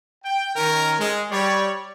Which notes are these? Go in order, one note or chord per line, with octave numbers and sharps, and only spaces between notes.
G5
D#3 C#4 A#4
G#3
G3 C#5 D5